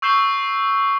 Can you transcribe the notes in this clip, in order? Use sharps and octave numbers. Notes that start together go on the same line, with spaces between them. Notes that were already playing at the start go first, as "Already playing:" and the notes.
C#6 E6 G6 C7 E7 G7